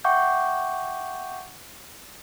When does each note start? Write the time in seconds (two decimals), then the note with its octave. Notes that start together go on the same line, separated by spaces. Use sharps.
0.04 E5 F#5 G5 C#6 D6 G6